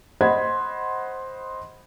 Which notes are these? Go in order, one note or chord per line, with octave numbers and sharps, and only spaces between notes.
C5 D#5 F#5 B5 C6 G#6